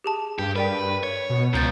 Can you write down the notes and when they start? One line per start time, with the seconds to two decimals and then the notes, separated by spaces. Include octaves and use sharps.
0.04 G4 G#4 A5
0.39 G2 G4
0.56 A#4 B4 D5 G5
1.03 C#5
1.30 B2
1.54 C#2 F3 B3 A#5 G6 A6